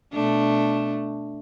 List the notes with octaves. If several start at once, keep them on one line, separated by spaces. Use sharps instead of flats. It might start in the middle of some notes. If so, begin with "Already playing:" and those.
B2 A3 D4